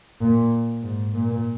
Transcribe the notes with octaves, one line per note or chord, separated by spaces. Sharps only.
A#2
G#2
A#2